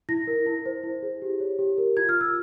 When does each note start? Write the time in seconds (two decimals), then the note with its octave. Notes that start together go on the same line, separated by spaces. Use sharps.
0.09 E4 A#6
0.27 A#4
0.46 E4
0.66 C5
0.83 E4
1.02 G#4
1.22 G4
1.40 C#5
1.59 G4
1.78 A#4
1.97 F4 G#6
2.09 F6
2.16 F4
2.21 E6